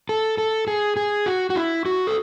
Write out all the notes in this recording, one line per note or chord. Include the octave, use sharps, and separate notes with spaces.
A4
A4
G#4
G#4
F#4
F#4
E4
F#4
A4